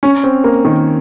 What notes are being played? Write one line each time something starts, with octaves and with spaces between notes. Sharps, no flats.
C#4
C4
A#3
D#3